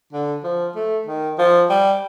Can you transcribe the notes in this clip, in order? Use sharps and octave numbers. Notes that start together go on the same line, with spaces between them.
D3
F3
A3
D#3
F3
G3